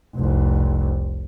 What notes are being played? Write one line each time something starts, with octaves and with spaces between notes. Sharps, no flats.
F1 C2